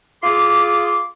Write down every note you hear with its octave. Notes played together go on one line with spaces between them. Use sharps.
F4 G#4 C6 D6